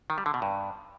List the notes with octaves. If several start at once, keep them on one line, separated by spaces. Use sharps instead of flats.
D#3
G3
D3
B2
G2